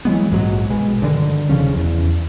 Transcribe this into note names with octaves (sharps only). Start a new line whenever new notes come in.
E3 F#3 G#3 B3
A#1 G#2 B2 F#3
B2 G#3
G2 D3 D#3
E1 C#3 F3 C#4
E2